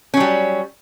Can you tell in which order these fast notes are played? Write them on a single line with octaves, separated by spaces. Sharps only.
C#4 F#3 G3